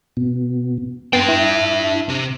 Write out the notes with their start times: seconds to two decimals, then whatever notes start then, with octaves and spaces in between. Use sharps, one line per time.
0.17 B2
1.13 B3 D4 G5 C6 A6
1.28 E4
2.09 C3